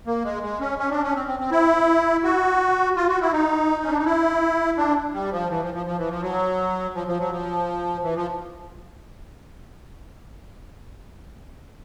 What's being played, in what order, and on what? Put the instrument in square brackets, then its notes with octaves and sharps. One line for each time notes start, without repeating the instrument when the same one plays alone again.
[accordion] A#3
G#3
G#3
C#4
C#4
D4
C#4
C4
C4
C4
E4
F#4
F4
F#4
E4
D#4
C#4
D4
D#4
E4
D4
G3
F3
E3
F3
F3
F3
E3
F3
F#3
F3
F3
F#3
F3
E3
F3